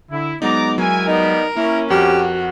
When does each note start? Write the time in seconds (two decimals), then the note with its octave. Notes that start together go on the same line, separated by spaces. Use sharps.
0.11 D3 E4
0.42 F#3 G#3 B3 D#4 D5 A#5 D6
0.78 F#3 G#3 E4 A#4 G#5
1.07 G3 B3 D#4 A#4
1.57 A#3 C#4 E4
1.90 F2 F#4 G4 F6